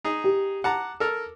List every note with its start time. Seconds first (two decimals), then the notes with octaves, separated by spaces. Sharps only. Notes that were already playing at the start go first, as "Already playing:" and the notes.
0.04 D#4 G#4
0.24 G4
0.64 F#5 A5 A#5 D6
1.00 A4 A#4 F6